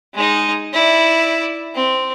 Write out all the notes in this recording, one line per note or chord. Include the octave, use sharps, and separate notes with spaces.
G#3 D#4
E4 D5
C4